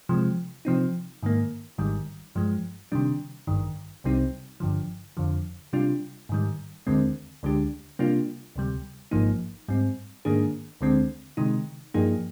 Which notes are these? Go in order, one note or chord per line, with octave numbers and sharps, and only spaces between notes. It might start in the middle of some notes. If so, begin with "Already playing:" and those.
C3 F3 G#3
C3 F3 C4 D#4
G#2 D#3 A#3
G#1 G#2 D#3 G3
G2 F3 G#3
C3 D#3 G3 D4
G#1 G2 D#3
C2 C3 G3 C4 D#4
G1 G2 D3 F3
F2 D3 F3
C3 G3 D4 F4
G#2 D#3 G3
D#2 D3 G#3 C4
D2 D3 G#3 D4 G4
C3 G3 A#3 D4 F4
D2 C3 G3
G#1 G#2 F3 A#3 D#4
G#2 G3 C4
G#2 D#3 A#3 D4 G#4
D2 D3 G#3 C4
C3 D#3 G#3 D#4
G2 F3 A#3 D#4 G#4